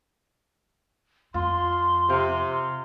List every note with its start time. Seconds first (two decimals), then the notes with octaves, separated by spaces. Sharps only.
1.34 F2 F4 C6
2.09 C3 C5 F5